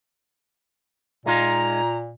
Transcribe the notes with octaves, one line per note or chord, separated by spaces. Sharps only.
A#2 G#3 D#4 F4 A#5